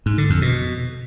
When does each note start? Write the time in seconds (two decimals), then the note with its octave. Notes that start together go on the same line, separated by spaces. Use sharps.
0.06 G#2
0.18 D3
0.30 F2
0.42 B2